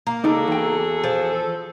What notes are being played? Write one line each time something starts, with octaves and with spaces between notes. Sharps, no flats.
A#3
C#2 D#4 F#4 G#4 A4 D5
E2 G5
F3
A4